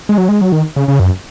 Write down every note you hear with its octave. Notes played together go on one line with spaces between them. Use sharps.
G#3
F#3
G#3
F#3
D#3
C#3
C#3
F#2